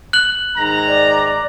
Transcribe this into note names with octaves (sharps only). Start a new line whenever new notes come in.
F#6 F#7
G#2 D#3 A#5
D5